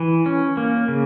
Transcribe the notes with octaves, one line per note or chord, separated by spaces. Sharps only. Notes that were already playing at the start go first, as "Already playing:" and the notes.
Already playing: E3
C#4
A#3
C#3